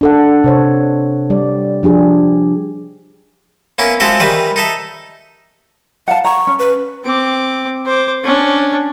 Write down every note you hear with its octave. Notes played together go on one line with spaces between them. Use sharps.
D4 A4 F#5
C3 C5 C#5
G3 D5
F3 D4 G4 G#4
A#3 B3 C#4 E4
G#3 C4 F4 F#4 A4 E5
D#3 E3 G3 B4 C5
D#4 A4 E5
F5 F#5 A5
A#5 C#6
C#4
B4
C4 D6
C5 D6
C#4 D4